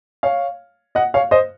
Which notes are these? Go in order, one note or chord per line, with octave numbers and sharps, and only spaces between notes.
C#5 F5
D#5 F#5
C#5 F5
C5 D#5